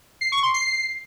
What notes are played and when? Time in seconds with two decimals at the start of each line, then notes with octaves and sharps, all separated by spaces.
0.21 C7
0.32 C#6
0.43 C6
0.54 C7